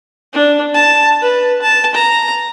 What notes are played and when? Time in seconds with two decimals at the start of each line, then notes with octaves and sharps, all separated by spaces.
0.33 D4
0.74 A5
1.21 B4
1.62 A5
1.94 A#5